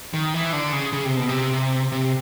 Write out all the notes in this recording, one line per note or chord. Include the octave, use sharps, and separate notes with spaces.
D#3
E3
D3
C#3
C#3
C3
B2
C3
C3